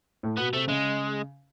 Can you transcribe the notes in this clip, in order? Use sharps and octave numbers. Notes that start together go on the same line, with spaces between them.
A2
B2 B3
C3 A3
C#3 G#3